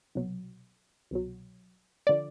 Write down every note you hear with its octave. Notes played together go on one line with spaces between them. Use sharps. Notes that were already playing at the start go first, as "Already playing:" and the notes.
C2 B2 F#3
C2 B2 F#3
D3 F3 D5